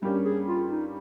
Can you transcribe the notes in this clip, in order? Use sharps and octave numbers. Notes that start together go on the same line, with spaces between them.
G2 G3 A#3 C#4 G4
G#4
F4
D#4